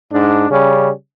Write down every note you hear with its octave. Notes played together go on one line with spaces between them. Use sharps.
G#2 D4
C#3 G3 C#4